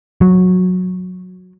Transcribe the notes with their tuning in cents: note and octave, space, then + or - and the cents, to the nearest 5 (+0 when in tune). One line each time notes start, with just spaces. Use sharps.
F#3 -15